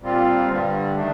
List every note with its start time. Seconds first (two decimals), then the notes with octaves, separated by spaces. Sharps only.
0.02 A#2 G3 C4 F4
0.48 G2 D3 G3
0.95 D#3 A3 D4